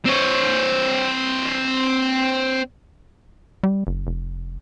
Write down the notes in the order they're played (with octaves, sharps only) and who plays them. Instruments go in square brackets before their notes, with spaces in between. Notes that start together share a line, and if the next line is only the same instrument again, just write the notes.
[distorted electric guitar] C4 C#5
[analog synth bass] G3
F#1
F1